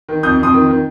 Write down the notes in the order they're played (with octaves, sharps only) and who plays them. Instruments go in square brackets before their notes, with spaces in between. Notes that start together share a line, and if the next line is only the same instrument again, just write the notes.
[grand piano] D#3
F2 D#6 G6
F2 C6 D#6
D#3
D#3